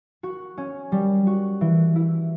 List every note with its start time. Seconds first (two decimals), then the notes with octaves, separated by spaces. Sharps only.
0.23 F#4
0.57 C#4
0.92 G3
1.27 F#4
1.61 E3
1.96 E4